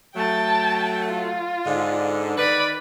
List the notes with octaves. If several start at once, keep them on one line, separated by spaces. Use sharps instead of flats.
F#3 A3 G5 A5
F4
G#2 D3
D#3 B4 D5 B5